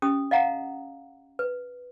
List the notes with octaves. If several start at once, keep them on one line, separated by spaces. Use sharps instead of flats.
C#4 G4 D#6
D#5 F5 F#5 A#5
B4